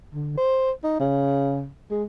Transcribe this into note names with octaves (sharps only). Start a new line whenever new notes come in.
D3
C5
D#4
C#3
G#3